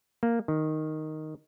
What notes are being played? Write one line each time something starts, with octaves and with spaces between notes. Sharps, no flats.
A#3
D#3